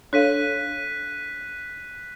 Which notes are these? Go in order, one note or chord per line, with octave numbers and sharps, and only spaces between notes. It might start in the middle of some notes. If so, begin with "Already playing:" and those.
D4 A4 C#5 F5 F#6 B6 D#7